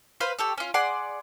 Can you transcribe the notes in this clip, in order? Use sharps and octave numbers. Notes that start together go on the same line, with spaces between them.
B4 C5 F5 B5
G4 A4 C#5
C#4 F4
G#4 D5 F#5 C6